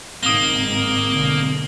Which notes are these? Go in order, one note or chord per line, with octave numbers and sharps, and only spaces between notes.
F#1 G#2 D#3 A#3 C4 D#6 G7
B1 G#2 D3